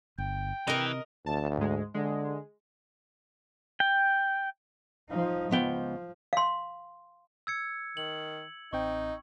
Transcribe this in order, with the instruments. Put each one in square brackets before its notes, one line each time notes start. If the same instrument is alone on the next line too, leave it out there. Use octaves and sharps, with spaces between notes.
[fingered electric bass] G1 [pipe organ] G5
[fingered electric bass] C3 [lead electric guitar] E3 [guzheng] A#4 D#5
[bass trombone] D2 [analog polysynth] A5
[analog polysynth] G#2 G#3
[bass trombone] D3 [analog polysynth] G#3
[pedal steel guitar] G5
[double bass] F3 D#4
[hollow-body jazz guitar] C#2 B3 G5 [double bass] F3
[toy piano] F5 C6
[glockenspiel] E6 G#6 C#7
[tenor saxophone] D#3 [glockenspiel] F#7
[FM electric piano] A1 C4 G5 [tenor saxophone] D#4 [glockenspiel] C#6